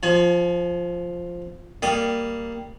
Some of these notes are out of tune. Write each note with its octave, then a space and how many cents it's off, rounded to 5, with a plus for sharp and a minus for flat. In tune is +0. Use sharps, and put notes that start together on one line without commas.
F3 +0 G#5 +35
G3 +0 A#3 -10 D#6 +0